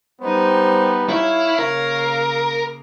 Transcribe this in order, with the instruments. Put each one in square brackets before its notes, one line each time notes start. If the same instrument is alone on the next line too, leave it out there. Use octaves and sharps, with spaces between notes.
[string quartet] G3 D#4 G4 [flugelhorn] B3 [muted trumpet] C5
[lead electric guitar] E4 [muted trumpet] C#5 [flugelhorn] F5
[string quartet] C#3 A#3 [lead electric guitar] A#4